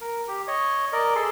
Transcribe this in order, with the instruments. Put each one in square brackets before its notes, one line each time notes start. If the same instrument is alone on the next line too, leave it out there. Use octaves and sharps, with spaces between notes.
[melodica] A#4
G4
C#5 D#5
A#4 D5 D#5
G#4 A4 C6